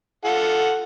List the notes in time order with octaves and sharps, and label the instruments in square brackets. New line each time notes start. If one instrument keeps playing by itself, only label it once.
[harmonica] F4 A4 F#5